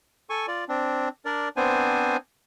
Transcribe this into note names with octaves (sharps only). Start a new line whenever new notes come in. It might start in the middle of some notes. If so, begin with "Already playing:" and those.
A4 G#5 C#6
F4 D5
C4 D4
D4 A#4 D5
B3 C4 D4 C5 G#5